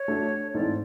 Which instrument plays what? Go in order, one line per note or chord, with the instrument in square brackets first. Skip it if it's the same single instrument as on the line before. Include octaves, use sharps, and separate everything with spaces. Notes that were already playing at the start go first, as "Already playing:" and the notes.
Already playing: [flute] C#5
[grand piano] A3 D4 F#4
[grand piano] G#2 E3 A3 C4 [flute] D5